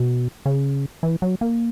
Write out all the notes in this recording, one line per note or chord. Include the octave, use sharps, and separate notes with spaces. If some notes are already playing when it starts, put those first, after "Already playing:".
Already playing: B2
C#3
E3
F#3
A#3